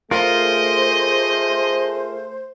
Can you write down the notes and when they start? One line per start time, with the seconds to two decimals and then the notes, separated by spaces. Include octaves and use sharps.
0.11 A3 F4 G#4 A#4 C5 D#5